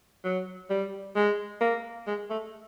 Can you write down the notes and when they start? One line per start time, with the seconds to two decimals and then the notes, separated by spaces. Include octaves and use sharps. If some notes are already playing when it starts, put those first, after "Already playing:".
0.25 F#3
0.70 G3
1.16 G#3
1.61 A#3
2.07 G#3
2.30 A3